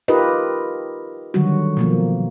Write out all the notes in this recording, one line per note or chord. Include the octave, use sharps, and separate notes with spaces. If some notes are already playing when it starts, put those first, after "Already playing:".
D#4 F4 G4 A#4 B4 D#5
D3 D#3 F#3 G3 F#4
B2 F3 A#3